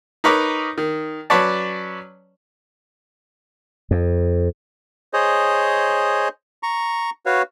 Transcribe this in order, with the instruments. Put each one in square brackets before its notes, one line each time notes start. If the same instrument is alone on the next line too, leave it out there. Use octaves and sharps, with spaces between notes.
[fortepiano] D#4 A#4 B4 C#5 A#5 D6
D#3
F#3 C#4 B4 C#5 D5 A5
[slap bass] F2
[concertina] G#4 C5 C#5 D#5
A#5 C#6
F#4 B4 C#5 F5